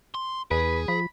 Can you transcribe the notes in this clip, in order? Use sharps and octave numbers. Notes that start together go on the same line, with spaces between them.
C6
E2 G#4 B4
F3 B5